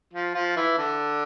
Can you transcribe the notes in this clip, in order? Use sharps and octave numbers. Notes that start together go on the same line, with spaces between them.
F3 F4
F3 F4
E3 E4
D3 D4